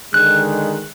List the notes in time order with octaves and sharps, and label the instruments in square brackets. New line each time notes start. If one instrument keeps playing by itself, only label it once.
[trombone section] D3 D#3 G#3 [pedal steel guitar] F#6